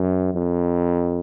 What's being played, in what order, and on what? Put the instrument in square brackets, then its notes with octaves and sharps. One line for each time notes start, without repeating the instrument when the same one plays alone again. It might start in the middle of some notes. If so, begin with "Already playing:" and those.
Already playing: [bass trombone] F#2
F2